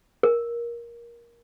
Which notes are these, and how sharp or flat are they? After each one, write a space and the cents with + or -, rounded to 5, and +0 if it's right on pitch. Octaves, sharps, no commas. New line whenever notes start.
A#4 +15